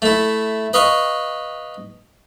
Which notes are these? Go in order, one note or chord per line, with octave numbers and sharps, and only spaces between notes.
A3 E4
B4 D#5 F5 C#6